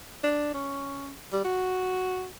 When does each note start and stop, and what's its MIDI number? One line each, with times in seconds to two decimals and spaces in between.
0.24 0.51 62
0.54 1.11 61
1.32 1.40 55
1.44 2.27 66